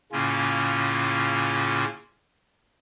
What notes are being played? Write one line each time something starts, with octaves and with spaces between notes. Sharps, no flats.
A2 C#3 A#3 C#4 F4